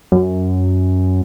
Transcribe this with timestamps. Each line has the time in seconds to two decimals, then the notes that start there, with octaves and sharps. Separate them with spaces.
0.12 F#2